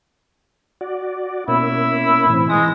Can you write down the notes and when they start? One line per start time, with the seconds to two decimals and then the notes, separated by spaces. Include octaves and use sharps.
0.81 F#4 D5
1.48 B2 A#3 C#4 E4
2.30 A2 E3 C4
2.50 E3 G#3 A#6